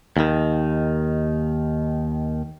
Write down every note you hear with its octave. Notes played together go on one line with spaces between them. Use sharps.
D#2 D#3